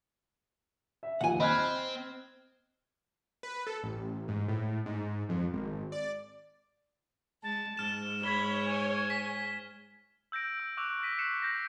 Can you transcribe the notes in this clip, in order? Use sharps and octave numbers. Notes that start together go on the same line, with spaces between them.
E5
D#2 F3 F#5 G#5
C4 D#5 B5 F6 F#6 G#6
B4
A4
A1
G#2
A2
G#2
F2
G#1
D5
G#3 A5
G#2 F6 E7
C#5 B5 G#6 G7
G#5
B6
E6 G6 A#6 D7
E6
C#6 D6 E6 F#6 F7
D6 F6 A#6 B6 D#7
F#6 C7 C#7 E7 F7
G6 A#6 E7